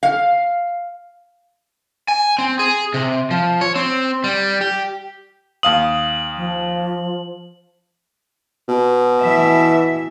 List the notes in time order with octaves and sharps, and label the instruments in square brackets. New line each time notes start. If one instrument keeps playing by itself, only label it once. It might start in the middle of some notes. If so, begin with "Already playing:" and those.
[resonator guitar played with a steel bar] F5
[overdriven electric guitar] G#5
C4
G#4
C3
F3
C#5
C4
G3
G4
[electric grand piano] D#2 F5 D#6 [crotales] F#7
[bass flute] F3
[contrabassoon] B2
[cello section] E3 E5